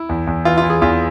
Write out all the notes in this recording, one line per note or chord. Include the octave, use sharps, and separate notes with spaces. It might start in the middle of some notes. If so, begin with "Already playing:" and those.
Already playing: E4
E2
E2
E3 F4
F4
E3
G#4
E2 F4